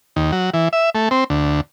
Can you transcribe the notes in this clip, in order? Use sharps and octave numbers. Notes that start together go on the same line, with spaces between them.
D#2
F#3
E3
E5
A3
C4
D2